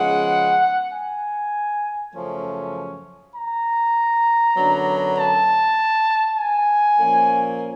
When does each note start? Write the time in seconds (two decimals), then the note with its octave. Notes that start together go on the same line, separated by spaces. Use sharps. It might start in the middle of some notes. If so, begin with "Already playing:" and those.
Already playing: C#3 F3 G#3 B3 F#5
0.93 G#5
2.14 F#2 C#3 F3 A3 C#4
3.35 A#5
4.56 F#2 D3 F#3 B3 D4
5.17 A5
6.37 G#5
6.98 A#2 F3 A#3 C#4